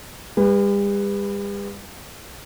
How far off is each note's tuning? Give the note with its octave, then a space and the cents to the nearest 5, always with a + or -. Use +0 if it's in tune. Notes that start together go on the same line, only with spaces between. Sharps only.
G3 +45 B4 +0